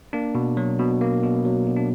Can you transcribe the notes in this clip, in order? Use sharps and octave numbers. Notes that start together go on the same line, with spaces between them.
A#3 D4
B2
F#3
B2
A#3
B2
F#3
B2
D4